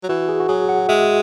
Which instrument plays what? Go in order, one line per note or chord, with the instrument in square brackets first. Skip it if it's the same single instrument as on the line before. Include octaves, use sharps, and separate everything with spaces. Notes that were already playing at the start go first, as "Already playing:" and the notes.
[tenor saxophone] F#3
[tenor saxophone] E3 [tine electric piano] F#4
[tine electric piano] G#4
F#4
[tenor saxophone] F#3 [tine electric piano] G#4
[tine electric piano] F#5
[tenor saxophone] G#3 [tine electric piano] E5